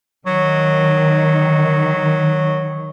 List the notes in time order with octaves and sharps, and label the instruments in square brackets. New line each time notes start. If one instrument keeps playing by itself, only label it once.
[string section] D#3 [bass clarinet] F#3